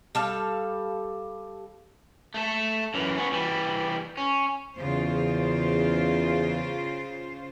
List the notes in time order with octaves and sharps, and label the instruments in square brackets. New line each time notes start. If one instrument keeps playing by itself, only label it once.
[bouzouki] G3 A4 F5
[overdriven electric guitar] A3 A4
F#2 E3
B3 C#4
E3 G3
C#4
[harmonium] E2 [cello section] C#3 F4 C5